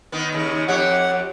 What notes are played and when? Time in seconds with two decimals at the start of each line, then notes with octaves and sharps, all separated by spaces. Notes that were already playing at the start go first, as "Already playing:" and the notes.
0.12 D#3 B3
0.32 D#2 C#3
0.68 F2 G4 C#5 F#5